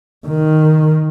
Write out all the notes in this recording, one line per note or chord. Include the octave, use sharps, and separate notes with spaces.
D#3